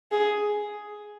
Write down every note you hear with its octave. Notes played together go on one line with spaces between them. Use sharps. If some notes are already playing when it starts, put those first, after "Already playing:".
G#4